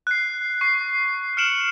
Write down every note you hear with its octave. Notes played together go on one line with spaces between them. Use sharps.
F#6 C7
C#6 C7
F6 C#7 D7 E7 F#7